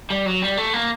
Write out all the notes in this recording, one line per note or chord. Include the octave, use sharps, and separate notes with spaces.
G3
F#3
G3
A3
A#3